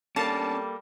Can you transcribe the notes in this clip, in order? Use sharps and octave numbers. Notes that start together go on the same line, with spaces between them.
G3 A#3 C#4 D4 A4 A5